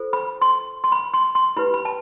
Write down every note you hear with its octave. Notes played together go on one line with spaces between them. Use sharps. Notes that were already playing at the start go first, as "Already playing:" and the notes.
Already playing: F4 A4 C5
B5
C6
C6
B5
C6
C6
E4 G4 B4 B5
B5
A5